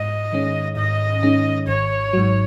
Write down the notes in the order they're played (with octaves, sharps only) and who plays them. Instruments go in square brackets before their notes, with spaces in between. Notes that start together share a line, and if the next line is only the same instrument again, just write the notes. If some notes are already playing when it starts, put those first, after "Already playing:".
Already playing: [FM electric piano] G#2 [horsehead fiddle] D#5
[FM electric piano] D#3 G#3 C#4
[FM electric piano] G#2 [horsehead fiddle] D#5
[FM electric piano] D#3 G#3 C#4
[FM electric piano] G#1 [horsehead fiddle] C#5
[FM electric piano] G#2 F#3